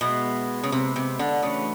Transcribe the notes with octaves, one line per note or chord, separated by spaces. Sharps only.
B2 G#3 B3 E4
C#3
C3
C3
D3
C#3 E3 A3 D4 F#4 B4